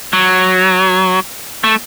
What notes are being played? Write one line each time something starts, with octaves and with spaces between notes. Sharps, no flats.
F#3
A3